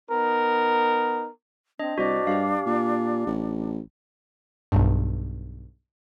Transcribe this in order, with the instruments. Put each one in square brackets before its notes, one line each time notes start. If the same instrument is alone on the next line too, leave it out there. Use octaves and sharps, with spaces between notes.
[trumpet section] B3 D#4 A#4
[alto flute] C4 [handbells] D4 D#5
[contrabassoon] C2 [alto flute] D4 [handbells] F#4 C5 D#5
[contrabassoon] G2 [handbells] G4 F5
[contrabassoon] A#2
A1
[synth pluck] B1 G2